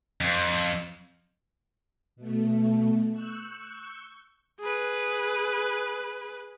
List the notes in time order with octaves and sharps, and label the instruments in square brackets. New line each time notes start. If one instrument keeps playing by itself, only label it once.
[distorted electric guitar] F2
[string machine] B2 A3
C#6 E6 F#6 G6
[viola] G#4 B4